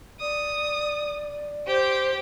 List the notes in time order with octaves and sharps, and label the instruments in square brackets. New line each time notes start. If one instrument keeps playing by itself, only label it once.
[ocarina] D5 [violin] D#6
[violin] G4 G5 [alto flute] C5